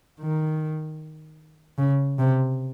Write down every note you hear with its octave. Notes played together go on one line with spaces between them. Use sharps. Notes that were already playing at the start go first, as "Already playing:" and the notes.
D#3
C#3
C3